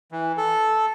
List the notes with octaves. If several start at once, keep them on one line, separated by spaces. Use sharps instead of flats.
E3
A4